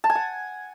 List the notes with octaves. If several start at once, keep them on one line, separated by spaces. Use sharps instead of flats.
A5
G#5
F#5